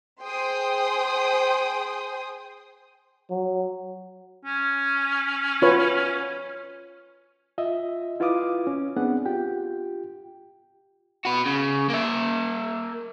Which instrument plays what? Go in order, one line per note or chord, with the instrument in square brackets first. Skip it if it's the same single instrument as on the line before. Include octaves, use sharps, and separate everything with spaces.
[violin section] G#4 C5 G5 C6 D#6
[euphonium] F#3
[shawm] C#4
[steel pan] F4 B4 C#5
[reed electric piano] F4 D#5 E5
E4 F4 B4 F5 D6 D#6
C#4
B3 C4 D4 G#4 F#5
F4 G4 G5
[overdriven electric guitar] F#4 B4
C#3
A#3 E5